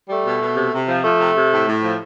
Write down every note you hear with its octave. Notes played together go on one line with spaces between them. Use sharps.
G3 A3
B2
B2
C3
C3
F3
F3 A3
C3
C3
A2
A2
F3